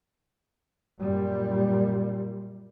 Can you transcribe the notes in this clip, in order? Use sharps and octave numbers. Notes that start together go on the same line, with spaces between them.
F#2 A#2 G3